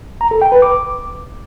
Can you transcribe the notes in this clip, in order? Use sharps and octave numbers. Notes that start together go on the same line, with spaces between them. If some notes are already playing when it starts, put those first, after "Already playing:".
A#5
A4
G5
B4
D6